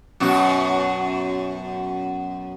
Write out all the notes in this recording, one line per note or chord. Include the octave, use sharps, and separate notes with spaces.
F#2 B2 F#4